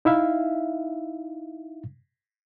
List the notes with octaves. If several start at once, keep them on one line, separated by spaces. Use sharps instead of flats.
D#4 E4 E5 F5